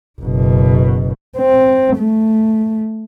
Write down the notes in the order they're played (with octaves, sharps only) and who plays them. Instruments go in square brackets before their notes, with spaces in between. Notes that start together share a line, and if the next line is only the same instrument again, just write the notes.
[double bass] F#1 B2
C4
A3